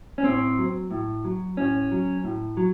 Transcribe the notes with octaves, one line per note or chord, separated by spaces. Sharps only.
C#4
A2 C4
F#3
A2
F#3
A2 C#4
F#3
A2
F#3